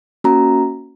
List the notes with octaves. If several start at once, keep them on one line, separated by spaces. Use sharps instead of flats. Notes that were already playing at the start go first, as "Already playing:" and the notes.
A#3 C#4 F#4 A#5